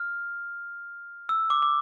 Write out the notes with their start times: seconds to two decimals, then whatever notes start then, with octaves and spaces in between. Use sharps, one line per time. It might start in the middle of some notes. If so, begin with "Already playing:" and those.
Already playing: F6
1.29 E6
1.50 D6
1.62 D6